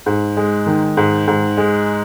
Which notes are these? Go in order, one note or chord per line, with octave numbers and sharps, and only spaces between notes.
G#2
G#3
D#3
G#2
G#2
G#3